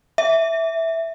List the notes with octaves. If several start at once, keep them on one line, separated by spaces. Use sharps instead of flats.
E5